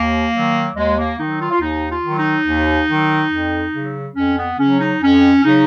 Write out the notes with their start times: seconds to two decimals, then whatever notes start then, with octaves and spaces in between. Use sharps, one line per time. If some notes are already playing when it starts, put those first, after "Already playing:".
Already playing: D#2 A#3
0.34 D#3 F#3
0.76 D#2 G#3
0.98 A#3
1.19 D#3 F#3 D#4
1.40 F4
1.51 F4
1.61 D#2 D#4
1.90 F4
2.04 D#3 F#3
2.18 D#4
2.46 D#2
2.89 D#3 F#3
3.31 F2
3.74 C#3 F#3
4.16 F2 C#4
4.38 B3
4.59 C#3 F#3 C#4
4.80 D#4
5.01 F2 C#4
5.44 C#3 F#3 D#4